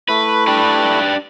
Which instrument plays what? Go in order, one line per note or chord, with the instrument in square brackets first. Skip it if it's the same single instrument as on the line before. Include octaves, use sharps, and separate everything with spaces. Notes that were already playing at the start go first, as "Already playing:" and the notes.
[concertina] A3 E4 [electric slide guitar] B4
[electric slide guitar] D4 G4 B4